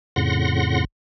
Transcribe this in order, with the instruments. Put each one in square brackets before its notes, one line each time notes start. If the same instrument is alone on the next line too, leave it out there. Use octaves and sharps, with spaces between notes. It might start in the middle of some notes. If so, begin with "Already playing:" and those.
[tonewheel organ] F2 A2 C#3 F#5 C6 A#6